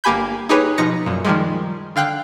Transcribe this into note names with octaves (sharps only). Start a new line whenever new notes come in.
G1 A#3 G4 G#5 B5 G6
D#4 G4 G#4 B4 C#5
B2 F3 D#4 A#6 C#7
F#2 A#2
D#3 F3 G3 G#3
D3 F5 G5 F#6